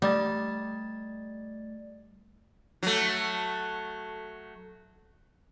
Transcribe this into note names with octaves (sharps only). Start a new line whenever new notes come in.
G3 A3 D5 A6
F#3 A3